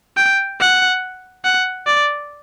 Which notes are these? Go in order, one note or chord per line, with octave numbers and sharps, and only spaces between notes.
G5
F#5
F#5
D5